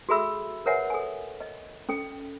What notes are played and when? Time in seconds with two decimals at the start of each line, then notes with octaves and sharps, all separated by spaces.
0.09 F#4 G#4 A4 E5 B5 E6
0.66 A#4 B4 C#5 E5 F#5 G#5
0.90 A4 G#5
1.41 D#5
1.89 C#4 A4 G5